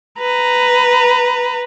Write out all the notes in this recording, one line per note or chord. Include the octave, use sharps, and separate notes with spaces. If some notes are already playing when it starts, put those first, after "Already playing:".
B4 A#5